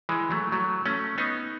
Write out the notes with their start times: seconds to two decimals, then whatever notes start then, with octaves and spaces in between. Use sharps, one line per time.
0.09 E3 G#3
0.31 F#3 A3
0.52 F#3 A3
0.86 A3 C#4
1.18 B3 D#4